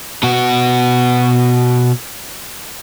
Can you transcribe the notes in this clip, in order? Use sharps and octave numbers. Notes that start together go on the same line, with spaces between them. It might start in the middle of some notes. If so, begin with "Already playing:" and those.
B2 F#4